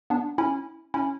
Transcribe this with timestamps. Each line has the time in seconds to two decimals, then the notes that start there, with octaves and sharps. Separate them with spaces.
0.10 B3 D4
0.38 C#4 E4
0.94 C#4 E4